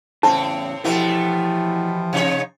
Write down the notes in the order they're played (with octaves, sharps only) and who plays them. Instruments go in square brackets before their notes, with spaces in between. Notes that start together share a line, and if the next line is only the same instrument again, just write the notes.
[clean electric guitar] E2 C#3 [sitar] A2 C4 [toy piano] A5
[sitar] B2 A3 B3 [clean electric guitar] E3 E4 G4 [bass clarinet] F3
[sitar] C3 D#4 C#5